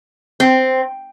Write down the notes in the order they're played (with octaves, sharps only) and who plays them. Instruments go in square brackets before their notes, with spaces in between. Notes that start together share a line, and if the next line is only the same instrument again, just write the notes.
[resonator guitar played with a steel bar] C4